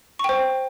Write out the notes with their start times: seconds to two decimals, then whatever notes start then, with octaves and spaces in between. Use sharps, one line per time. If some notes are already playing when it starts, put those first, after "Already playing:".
0.19 C#6
0.24 G5
0.29 C5